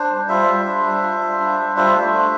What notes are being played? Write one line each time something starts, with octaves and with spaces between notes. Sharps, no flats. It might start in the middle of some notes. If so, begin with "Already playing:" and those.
Already playing: D4 C5
G3
F4 C5 E5
G3
D4
G3
F4
G3
D4
G3
F4 C5 E5
A3
D4